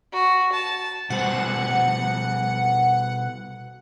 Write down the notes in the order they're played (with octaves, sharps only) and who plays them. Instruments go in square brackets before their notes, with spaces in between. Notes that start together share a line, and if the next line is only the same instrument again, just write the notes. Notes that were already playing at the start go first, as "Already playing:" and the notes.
[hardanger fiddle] F#4
A5
[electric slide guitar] B2 G3 C5 [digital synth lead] F#5